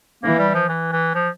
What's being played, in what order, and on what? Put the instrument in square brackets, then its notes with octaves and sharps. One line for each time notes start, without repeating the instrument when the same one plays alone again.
[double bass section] E3 [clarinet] A#3
[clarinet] G3
F3
E3
E3
F3